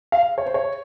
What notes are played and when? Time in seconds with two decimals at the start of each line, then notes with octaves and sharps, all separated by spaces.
0.12 F5
0.38 C#5
0.46 C5
0.54 C#5